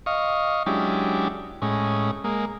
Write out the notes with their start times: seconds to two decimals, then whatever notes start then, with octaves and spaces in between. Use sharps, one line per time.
0.06 D#5 F5 C#6
0.66 F#3 G#3 C#4 D4 E4 G4
1.62 A2 G#3 C#4
2.24 G#3 A#3